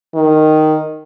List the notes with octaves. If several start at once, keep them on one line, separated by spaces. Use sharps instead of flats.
D#3